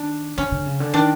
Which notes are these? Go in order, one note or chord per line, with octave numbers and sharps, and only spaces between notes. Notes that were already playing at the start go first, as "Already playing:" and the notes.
Already playing: D#3 D4
D3 C#4
D3
C#3
D3
D#3 D4